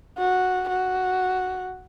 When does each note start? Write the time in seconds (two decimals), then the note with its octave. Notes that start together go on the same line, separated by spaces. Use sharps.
0.18 F#4
0.69 F#4